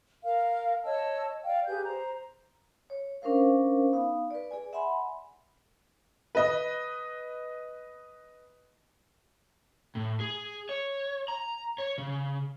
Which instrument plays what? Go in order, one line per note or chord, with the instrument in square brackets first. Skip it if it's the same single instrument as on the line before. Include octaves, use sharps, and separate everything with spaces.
[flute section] A#4 F5
C#5 D#5 A5 E6
D5 F5 G5
G4 G#4 B4 G6
C5 A#5
[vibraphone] C#5
C#4 D4 A#4 C5 F5
B3 D#4 F5
B4 D5
G#4 D5 G#5
E5 F#5 G#5 B5 C6
[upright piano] B4 D#5
[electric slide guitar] A2
G#4
C#5
A#5
C#5
C#3